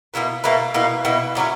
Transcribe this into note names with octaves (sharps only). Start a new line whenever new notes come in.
B2 A#3 E4 B4
B2 A#3 E4 B4
B2 A#3 E4 B4
B2 A#3 E4 B4
A#2 F#3 C#4 E4